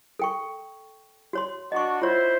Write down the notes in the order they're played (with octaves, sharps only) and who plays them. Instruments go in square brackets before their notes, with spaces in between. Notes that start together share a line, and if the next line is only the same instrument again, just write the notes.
[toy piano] A4 G5 C#6
F#4 C#5 C6
[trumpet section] D4 F#4 [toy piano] D#5 C#6
[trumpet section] E4 C5 [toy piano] F4 C#5